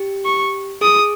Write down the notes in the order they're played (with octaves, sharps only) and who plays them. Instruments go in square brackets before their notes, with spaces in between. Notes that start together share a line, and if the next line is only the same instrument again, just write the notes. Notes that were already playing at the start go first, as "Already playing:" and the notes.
Already playing: [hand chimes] G4
[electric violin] C#6
[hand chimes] G#4 [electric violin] D#6